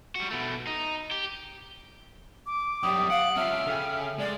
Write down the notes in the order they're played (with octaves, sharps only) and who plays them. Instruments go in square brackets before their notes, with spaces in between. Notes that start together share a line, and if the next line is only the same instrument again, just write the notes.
[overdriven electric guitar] G3 F#4
B2 A3
D#4
G4
[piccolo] D6
[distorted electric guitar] F#2 G3 [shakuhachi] G5 [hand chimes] D#6
[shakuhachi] F5 [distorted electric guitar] F#5 [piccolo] D7
[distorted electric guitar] C#4 F4 [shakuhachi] E5 [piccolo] F6
[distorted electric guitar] C#3 [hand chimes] A4 G5
[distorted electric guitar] G#3 [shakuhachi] D5